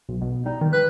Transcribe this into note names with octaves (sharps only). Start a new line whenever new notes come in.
B1
B2
G3 D#4
D#3
B4 F#6